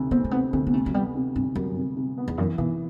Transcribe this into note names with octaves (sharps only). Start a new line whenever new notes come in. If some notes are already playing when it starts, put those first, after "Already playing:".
Already playing: D2 C3
B3 C4
A3
C3 B3
D2 C4
B3
C3 A3
F#3
G3 B3
C3
G2 C3
F#2 G3
C3
C3
B3
E2
F#2 E3
B2 E3